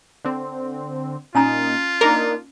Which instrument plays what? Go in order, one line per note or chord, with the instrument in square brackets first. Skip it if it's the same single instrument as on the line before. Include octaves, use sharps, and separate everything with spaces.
[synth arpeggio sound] D3 C4
[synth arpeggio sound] A#2 D#4 [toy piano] C#4 G#5 A#5 [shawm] F4
[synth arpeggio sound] A#3 D4 D#4 [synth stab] A#4